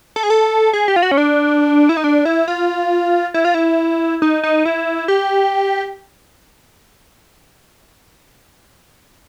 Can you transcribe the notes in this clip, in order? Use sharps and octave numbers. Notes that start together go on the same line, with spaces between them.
A4
G#4
A4
G#4
G4
F4
F#4
C#4
D4
E4
D#4
D4
E4
F4
E4
F4
E4
D#4
D#4
E4
G4